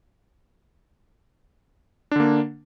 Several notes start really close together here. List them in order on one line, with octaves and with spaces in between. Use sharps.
D4 D3 A#3